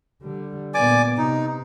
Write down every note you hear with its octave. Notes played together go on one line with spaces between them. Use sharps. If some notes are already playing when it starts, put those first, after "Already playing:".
D3 G3
A#2 B3 D5 G#5 D6
C3 D#4